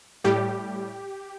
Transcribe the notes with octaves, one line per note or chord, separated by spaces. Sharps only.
A2 G3 G4